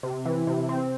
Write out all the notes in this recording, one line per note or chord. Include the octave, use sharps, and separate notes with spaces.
C3
E3
C3
C4